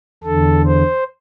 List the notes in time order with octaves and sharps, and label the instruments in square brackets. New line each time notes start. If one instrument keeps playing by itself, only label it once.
[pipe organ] E2 D3 A4
C5